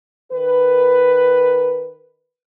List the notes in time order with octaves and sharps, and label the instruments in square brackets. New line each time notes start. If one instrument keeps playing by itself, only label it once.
[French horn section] D#3 A#4 B4